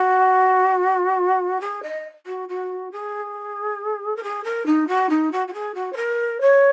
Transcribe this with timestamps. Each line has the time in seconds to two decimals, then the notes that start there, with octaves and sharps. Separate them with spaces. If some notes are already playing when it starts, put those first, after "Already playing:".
Already playing: F#4
1.60 G#4
1.82 D#5
2.26 F#4
2.48 F#4
2.91 G#4
4.16 A#4
4.23 G#4
4.44 A#4
4.66 D#4
4.87 F#4
5.09 D#4
5.31 F#4
5.47 F#4
5.53 G#4
5.74 F#4
5.92 C#5
5.96 A#4
6.41 C#5